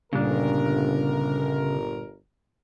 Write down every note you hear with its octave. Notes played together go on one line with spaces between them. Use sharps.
G1 A#2 C#3 G3 D4 A#4